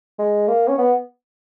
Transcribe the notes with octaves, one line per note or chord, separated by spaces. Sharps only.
G#3
A#3
C#4
B3